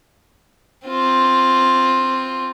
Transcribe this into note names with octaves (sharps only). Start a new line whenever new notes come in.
C4 F4